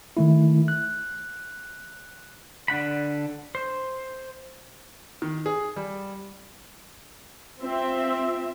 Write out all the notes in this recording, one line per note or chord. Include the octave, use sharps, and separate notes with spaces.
D#3 A3 E4
F#6
D3 D4 F#5 B5
C5
D#3
G#4
G3
C4 F4 E5